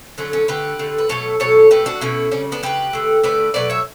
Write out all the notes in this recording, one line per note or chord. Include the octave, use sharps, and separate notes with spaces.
D3 F#3 A3 C#4
C#4
D3 A3 G4 B4
D3 A3
B4
B2 F#3 A3 A4 C#5
B2 F#3 A3 A4 C#5
B2 A3 G4 B4
D4 F#4
B2 A3 C#4 E4
C#3 G3 C#4
B3 D4
C#3 G3 G4 B4
D3 A3
D3 A3 B4 D5
B2 F#3 A3 B4 D5
C#5 E5